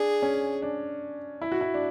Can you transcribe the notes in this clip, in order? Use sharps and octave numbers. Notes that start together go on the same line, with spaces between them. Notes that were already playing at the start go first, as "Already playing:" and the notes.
Already playing: D4 G#4
C#4
D4
E4
F#4
E4
D4